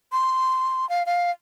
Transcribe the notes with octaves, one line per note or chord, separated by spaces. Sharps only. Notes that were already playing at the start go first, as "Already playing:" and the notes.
C6
F5
F5